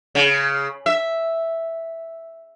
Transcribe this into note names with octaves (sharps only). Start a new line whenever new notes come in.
C#3
E5